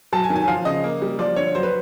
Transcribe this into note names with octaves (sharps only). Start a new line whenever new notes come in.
F#3 A5
G#5
D#3
G#5
F3 F5
C#3 D#5
A#3
G3
F3 D5
D3 C#5
F#3 C5
B4